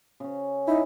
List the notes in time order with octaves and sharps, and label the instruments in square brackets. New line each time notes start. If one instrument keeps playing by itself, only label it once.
[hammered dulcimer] C#3 C#4
[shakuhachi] D#4 [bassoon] E4